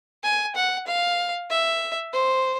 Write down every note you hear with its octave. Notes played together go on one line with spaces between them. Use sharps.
G#5
F#5
F5
E5
C5